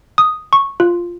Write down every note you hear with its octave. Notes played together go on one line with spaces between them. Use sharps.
D#6
C#6
F4